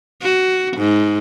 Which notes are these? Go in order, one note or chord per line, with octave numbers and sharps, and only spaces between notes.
F#4
G#2